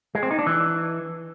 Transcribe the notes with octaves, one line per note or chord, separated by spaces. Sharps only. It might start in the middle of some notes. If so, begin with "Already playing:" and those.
G#3
C4
D#4
D4
E3